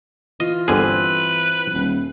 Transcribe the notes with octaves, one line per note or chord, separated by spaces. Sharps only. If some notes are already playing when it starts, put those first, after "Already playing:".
E3 F4 D#5
G1 D3 C4 G#4 B4
D#1